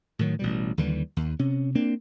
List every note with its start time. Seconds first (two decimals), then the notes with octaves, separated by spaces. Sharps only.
0.19 A2 D#3 F#3
0.39 A1 B2 G3
0.78 D#2 D3 E3 G3
1.17 D#2
1.39 C3 C#4
1.75 A#3 C4 D4